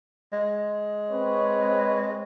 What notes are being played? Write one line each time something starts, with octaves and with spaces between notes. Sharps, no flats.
G#3
C4 B4 C#5